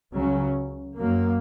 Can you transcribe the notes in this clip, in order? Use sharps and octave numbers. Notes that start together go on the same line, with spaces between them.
C#2 C#3 F#3 C#4
F#2 F#3 A#3